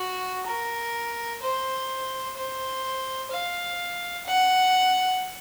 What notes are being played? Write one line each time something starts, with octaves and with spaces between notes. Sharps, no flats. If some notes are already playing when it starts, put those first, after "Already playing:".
Already playing: F#4
A#4
C5
C5
F5
F#5